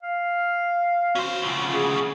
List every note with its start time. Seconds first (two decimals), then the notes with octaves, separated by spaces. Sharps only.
0.03 F5
1.15 C#4 F#4 C5
1.42 D2 C#3 F4
1.74 G#4